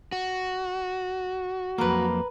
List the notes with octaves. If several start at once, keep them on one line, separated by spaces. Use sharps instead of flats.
F#4
F2 F#3 A#3 A#4 B4